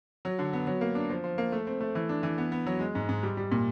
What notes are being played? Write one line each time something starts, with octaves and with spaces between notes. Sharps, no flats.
F#3
D3
B3
F#3
A#3
D4
F3
F3
A#3
A3
C4
A3
E3
D4
E3
B3
B3
F#3
G#3
G#2
G#2
G3
G3
A#2